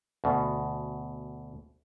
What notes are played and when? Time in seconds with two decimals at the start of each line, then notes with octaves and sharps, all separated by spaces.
0.24 D2 B2